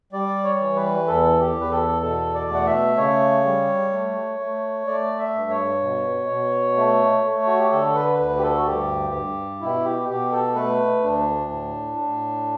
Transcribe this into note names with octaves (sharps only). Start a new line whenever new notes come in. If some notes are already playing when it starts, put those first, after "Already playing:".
G3 D5
C#5
E3
B4
E2 A4
G4
E2
B4
A4
B2 A4
D5
A3 F#5
E5
C#3 C#5
G3
A3
A3
A3 D5
E5
G2
C#5
B2
B2
A3
A3
F#4
G4
D3 A4
B4
D2 B4
G4
A4
F#4
G2 G4
G2
B2 E4
G4
B2 G4
A4
A3 B4
D2 D4
A2
A2